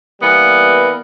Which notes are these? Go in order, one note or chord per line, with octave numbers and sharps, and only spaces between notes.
E3 G3 A#3 B3